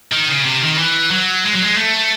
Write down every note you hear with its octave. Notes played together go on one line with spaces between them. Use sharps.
D#3
C#3
C3
D#3
E3
F#3
G#3
F#3
G#3
A3